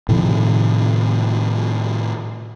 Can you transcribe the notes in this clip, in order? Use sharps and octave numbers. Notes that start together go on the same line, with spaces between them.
A2 C3 D#3 F3